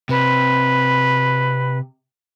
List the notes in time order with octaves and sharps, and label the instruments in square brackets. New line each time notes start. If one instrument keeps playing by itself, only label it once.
[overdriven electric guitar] C3 [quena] B4